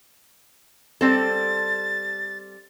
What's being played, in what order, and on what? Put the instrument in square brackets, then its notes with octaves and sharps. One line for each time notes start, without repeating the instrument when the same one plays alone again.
[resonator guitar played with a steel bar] G3 C4 A4 [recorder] A6